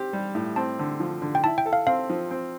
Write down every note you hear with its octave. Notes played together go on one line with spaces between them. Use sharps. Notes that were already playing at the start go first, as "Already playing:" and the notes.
Already playing: C4 G4
G3
A2
C4 A5
D3
F3
D3
G5
E4 A5
G5
A4
F5
C4 F5
F3
C4